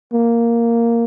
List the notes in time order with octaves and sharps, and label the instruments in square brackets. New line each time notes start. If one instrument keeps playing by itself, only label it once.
[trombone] A#3